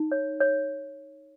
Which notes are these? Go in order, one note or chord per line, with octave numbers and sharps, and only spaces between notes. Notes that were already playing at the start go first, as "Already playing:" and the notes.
Already playing: D#4
C#5
C#5